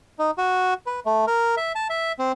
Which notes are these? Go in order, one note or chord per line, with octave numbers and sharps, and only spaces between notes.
D#4
F#4
B4
A3
A#4
E5
A5
E5
C4